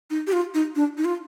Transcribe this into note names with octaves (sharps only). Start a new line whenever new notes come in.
D#4
G4
F4
D#4
D4
D#4
F4